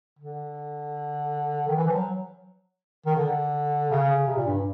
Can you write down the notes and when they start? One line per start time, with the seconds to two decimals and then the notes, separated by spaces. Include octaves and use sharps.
0.19 D3
1.67 D#3
1.77 E3
1.87 F3
1.95 F#3
3.06 D#3
3.16 D3
3.91 C#3
4.27 C3
4.37 A#2
4.46 G2